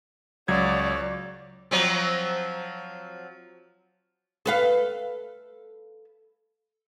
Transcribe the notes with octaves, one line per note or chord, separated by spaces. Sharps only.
C#2 F#3 C#5 D5 G#6
F3 F#3 C4
A4 B4 F5